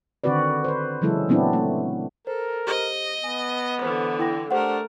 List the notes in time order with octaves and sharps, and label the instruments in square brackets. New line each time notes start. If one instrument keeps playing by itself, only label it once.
[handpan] D3 D#3 C4 F#4 B4 D5
B4 C5
C#3 E3 F#3 G#3 E4 A4
A#2 F#3 B3 C4 D4 E4
A3
[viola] A4 [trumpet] A#4 [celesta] C5
[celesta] G4 C5 [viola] D#5
[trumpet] B3 [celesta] G#5
[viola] D3 E3 [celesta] C5
[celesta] E4 G5 A#6
[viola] A3 A#4 [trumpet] D4 [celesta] G4 C5 F#5